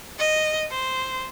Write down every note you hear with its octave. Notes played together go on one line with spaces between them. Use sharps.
D#5
C5